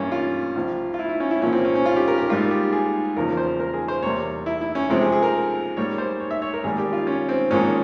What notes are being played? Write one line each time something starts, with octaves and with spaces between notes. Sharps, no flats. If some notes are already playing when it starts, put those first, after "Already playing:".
Already playing: G2 E3 G3 A#3 C#4 E4
F4
C2 C3 F3
F4
E4
E4
C#4
E4
C2 A#2 F3 A#3 C#4
C4
C#4
C#4
F4
G4
A#4
G4
G#2 G3 A#3 F4
G4
G#4
E2 C#3 F3 A#3 A#4
C5
A#4
G#4
C5
E2 C3 G3 A#3 C#5
E4
E4
C#4
F2 C3 F3 G#3 C4
G#4
G#4
A#4
G#2 G3 A#3 C#5
C5
C#5
E5
C#5
A#4
G#1 G#2 G3 A#3 G#4
G4
F4
C#4
C4
G#1 G#2 F3 A#3 C#4